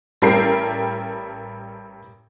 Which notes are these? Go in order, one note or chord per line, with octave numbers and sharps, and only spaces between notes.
A1 G3 A4 A#4 G5 C7